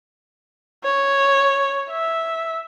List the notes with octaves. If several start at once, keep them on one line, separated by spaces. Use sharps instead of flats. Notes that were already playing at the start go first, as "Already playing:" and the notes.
C#5
E5